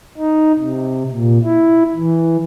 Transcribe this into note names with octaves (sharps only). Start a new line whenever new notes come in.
D#4
C3
A#2
E4
E3